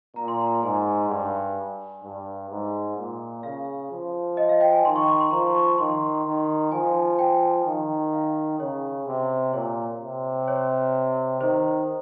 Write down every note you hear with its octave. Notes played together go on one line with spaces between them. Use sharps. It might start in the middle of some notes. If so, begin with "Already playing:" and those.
A#2 A#5
C6
A#5
G#2 G#5
G2
G2
G#2
A#2
C#3 F5
F3
D#5
F5
G5
G#5
D#3 C6
C#6
C#6
C6
F3 A#5
C#6
D#3 C6
D#3
F3 G#5
G5
D#3
F5
C#3 C#5
C3
A#2 C#5
C3
C#5
D#3 C5